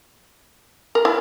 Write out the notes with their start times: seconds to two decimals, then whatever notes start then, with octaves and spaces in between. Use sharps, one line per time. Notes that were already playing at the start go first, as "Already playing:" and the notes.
0.95 A#4
1.05 E4